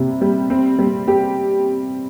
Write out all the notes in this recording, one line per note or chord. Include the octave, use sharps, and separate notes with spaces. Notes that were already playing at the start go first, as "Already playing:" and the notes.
Already playing: C3 G3
G3
C4
G3
G4